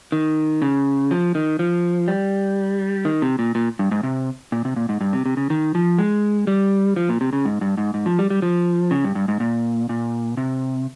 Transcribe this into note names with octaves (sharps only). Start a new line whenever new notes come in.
D#3
C#3
F3
D#3
F3
G3
D#3
C3
A#2
A#2
G2
G#2
C3
A#2
C3
A#2
G#2
G2
C3
C3
C#3
D#3
F3
G#3
G3
F3
A#2
C3
C#3
G#2
G2
G#2
G#2
F3
G3
G3
F3
C#3
G2
G2
G#2
A#2
A#2
C3